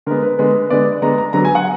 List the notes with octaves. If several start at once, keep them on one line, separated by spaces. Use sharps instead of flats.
D3 G#3 B3 A#4
B4
D3 G#3 B3
D3 G#3 B3 D5
D3 G#3 B3 A#5
A#5
D3 F#3 B3 A#5
G#5
F#5